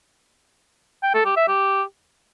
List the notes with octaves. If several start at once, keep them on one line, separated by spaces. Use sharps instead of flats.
G5
A4
G4
E5
G4